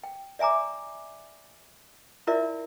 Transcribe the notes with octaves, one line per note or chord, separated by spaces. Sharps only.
G5
D5 E5 G#5 A#5 D6
E4 F4 A#4 D5 E5